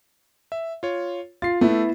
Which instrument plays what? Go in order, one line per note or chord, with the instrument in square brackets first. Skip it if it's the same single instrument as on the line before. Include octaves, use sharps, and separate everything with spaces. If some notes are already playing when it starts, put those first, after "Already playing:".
[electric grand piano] E5
F4 C#5
[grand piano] F4 [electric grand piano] A6 C7
[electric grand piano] A3 [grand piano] B3 E4